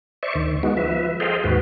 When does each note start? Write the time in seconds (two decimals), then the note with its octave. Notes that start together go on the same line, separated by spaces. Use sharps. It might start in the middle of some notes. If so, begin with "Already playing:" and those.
0.23 C5 D5 E5 C#6
0.35 D2 D#3
0.63 G#3 B3 D#4 F#4
0.77 F3 B4 E5
1.20 G#4 A4 C5 D#5 F5 G5
1.44 D#2 G#2 F#4 B4